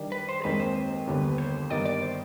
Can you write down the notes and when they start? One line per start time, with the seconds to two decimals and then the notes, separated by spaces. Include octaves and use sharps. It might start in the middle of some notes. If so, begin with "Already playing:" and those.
Already playing: D#3 G3 D4 G4
0.12 B4
0.29 C5
0.40 G#4
0.44 D#2 D#3 G#3 C4 B4
0.60 C5
0.76 B4
1.07 D#2 D3 G3 B3
1.38 C5
1.70 G2 D#3 B3 D#4 D5
1.86 D5
2.02 C5